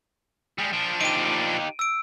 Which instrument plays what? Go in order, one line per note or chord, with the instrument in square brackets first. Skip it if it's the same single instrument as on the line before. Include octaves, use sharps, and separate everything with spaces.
[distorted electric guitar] G3 G#3
F3 D4
[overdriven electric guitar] D#4 G4 [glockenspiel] D7 D#7
[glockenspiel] E6 D7